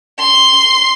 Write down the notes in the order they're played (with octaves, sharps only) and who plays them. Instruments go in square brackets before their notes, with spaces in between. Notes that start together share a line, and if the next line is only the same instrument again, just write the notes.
[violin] C6